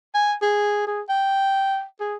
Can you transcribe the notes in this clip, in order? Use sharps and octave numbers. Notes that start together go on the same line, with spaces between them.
G#5
G#4
G#4
G5
G#4